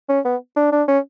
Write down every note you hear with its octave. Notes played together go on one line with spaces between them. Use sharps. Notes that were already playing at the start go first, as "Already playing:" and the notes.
C#4
B3
D4
D4
C#4